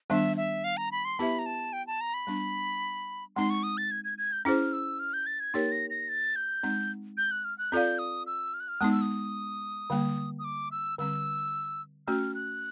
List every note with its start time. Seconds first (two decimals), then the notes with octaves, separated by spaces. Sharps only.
0.10 D#3 G3 B3 D4 E5
0.37 E5
0.64 F5
0.77 A#5
0.92 B5
1.05 C6
1.19 B3 E4 G4 B4 E5 B5
1.39 A#5
1.46 A5
1.73 G5
1.87 A5
2.01 A#5
2.14 B5
2.27 G3 B3 D4
3.36 G#3 C4 D#4 C6
3.50 C#6
3.63 D#6
3.78 A6
3.91 G#6
4.04 G#6
4.18 G#6
4.32 G6
4.45 C#4 E4 G#4 C5 F6
4.73 E6
5.00 F6
5.13 G6
5.26 A6
5.40 G#6
5.54 A#3 D#4 G4 A#4 C#5 A6
5.72 A#6
5.90 A#6
6.09 A6
6.36 G6
6.63 G#3 C4 D#4
7.17 G6
7.31 F#6
7.44 F6
7.58 F#6
7.72 C4 F4 A4 D5 F5 G6
7.99 D#6
8.27 E6
8.54 F6
8.60 F#6
8.68 F6
8.81 G#3 B3 D#4 D#6
8.92 E6
9.01 D#6
9.90 D3 G3 A#3
10.39 D#6
10.44 D6
10.72 E6
10.98 D3 G3 C4 E6
12.07 A3 C#4 F#4 F6
12.35 F#6